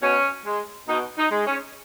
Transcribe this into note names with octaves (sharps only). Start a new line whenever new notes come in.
B2 C#4
G#3
B2 D#4
D#4
G#3
C#4